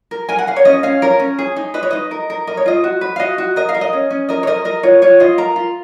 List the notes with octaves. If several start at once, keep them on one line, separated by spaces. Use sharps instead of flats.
A#4
A#4 G#5
F#5
A#4 F5
C#5
C#4 D#5
C#4 F5
A#4 C#5
C#4
G#4
D#4
B4 D#5
C#5
D#4 D#5
A#4
A#4
A#4 D#5
C#5
F4 D#5
F#4
B4
F5
F#4 D#5
F#4
A#4 D#5
F5
A#4
D#5
C#4
C#4
A#4 D#5
C#5
A#4 D#5
A#4 D#5
F4 C#5
F4 C#5
F4 D#5
A#4 A#5
F4